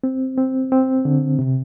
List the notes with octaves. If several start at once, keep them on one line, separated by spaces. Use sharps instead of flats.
C4
C4
C4
D3
C3